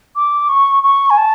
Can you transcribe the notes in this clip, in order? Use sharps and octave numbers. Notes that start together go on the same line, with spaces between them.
D6
C#6
C#6
G#5
A5